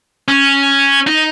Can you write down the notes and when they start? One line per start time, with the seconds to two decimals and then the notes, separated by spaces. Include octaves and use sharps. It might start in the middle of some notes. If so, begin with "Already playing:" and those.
0.28 C#4
1.07 D#4